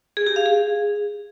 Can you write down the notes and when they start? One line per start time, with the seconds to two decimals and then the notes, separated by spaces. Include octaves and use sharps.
0.17 G#4
0.26 G4
0.36 F5
0.46 G#4